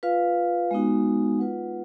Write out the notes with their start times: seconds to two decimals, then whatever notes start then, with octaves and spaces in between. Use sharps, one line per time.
0.03 F4 B4 F5
0.71 G#3 B3 D#4 F#4
1.39 F4 B4 F#5